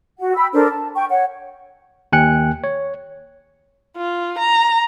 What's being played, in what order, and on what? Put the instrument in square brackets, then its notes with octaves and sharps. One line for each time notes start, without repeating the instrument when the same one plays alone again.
[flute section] F#4 F#5
G5 B5 E6
D4 A4 A#4 C5
A5
G5 C#6
C#5 F#5
[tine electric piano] D#2 G5 G#5 F#6 C#7
C#5
[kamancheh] F4
A#5